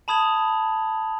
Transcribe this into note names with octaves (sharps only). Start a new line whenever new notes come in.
A5 B5 D#6 G#6 F7 F#7